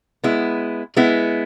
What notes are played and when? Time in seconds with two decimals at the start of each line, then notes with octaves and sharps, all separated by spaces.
0.24 G#3 B3 E4
0.96 G#3 B3 E4